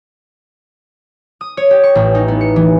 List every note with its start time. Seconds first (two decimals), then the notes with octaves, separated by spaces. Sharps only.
1.41 D#6
1.57 C#5
1.71 G4
1.83 C#6
1.95 A1
2.15 D#4
2.28 B3
2.41 C#7
2.56 E3